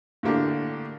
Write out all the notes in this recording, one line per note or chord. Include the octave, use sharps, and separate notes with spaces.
A2 D3 A#3 D4 G4